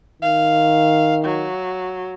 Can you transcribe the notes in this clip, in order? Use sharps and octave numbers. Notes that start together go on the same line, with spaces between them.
D#3 F5
F#3